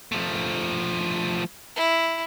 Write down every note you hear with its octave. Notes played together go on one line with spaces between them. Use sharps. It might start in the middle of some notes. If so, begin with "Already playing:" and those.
F3 A3
E4